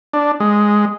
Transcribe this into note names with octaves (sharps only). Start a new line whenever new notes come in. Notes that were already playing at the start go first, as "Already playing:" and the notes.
D4
G#3